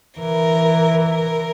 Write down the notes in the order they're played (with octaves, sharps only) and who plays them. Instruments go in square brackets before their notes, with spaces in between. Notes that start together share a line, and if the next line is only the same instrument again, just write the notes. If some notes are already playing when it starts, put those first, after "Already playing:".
[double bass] E3 [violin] A#4
[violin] A#4